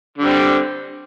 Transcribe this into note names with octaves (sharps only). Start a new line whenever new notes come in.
D3 G3 C4